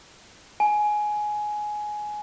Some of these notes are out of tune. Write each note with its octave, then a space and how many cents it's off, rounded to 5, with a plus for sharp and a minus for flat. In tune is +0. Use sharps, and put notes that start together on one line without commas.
G#5 +15